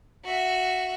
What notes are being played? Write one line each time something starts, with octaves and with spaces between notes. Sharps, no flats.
F#4 E5